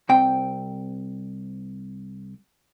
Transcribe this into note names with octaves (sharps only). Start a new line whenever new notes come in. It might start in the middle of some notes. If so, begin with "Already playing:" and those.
C2 C4 G5